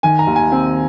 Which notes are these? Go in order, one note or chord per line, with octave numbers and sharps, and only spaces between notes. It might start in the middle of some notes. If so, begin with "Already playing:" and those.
D#3 G#5
A#5
D#2
G#5
C4